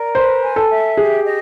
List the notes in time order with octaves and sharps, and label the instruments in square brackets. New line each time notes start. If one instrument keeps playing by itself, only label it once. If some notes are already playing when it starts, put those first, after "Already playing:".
Already playing: [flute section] A#4 D5
[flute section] B4 [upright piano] C5
[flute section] G#5
[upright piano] A4
[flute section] E5
[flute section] G4 [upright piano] G#4
[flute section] D#5